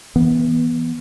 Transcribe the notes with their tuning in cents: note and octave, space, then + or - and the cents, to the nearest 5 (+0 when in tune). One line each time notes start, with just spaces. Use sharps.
E3 +0 B3 -20